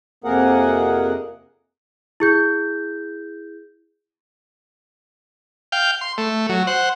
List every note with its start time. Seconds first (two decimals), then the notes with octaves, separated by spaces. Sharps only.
0.24 F2 C3 A#3 G#4 A#4 F#5
2.20 E4 G#4 G6
5.72 F5 G5
6.01 C6
6.18 A3
6.49 F#3
6.67 C5 F#5